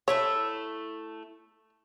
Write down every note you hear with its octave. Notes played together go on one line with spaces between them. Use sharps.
A3 E4 C#5 E5